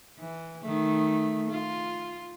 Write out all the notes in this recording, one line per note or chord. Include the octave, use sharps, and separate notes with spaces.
E3
D#3 A3
F4